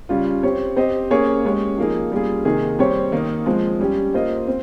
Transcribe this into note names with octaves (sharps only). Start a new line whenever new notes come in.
C#3 G3 C#4 F4
C4 G4 C#5
C4 G4 C5 D#5
A#3 C#4 G#4 C#5
G#3 C#4 G4 C#5
F3 A#3 D#4 G#4
G3 A#3 C#4 F4 G#4
C3 D#3 A#3 D#4 G#4
G3 C4 G4 C#5
D#3 A#3 D#4
F3 G#3 C4
G3 C#4 G4
A#3 F4 C5 D#5
C4